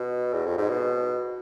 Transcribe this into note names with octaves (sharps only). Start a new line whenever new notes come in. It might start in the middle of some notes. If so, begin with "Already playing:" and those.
Already playing: B2
E2
F2
G#2
B2